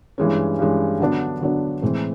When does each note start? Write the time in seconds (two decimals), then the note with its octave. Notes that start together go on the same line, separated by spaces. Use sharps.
0.18 G2 E3 G#3 C#4
0.59 G2 E3 G#3 C#4
1.00 D3 F#3 B3 D4
1.41 D3 F#3 B3 D4
1.82 A2 E3 G#3 C4